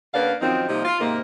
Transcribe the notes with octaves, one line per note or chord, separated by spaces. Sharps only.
C#3 A#3 B3 D4 F5
F#2 D#3 F3 C4 D#4
C3 F3 G3 A#3 D#4
F4
G#2 C3 D#3 A#3